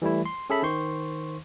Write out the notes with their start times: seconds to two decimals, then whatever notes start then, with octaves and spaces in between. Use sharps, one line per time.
0.02 E3 G3 A3 E4
0.26 C6
0.50 C#4 G#4 A4 E5 B5
0.63 D#3 C5 C6 C#6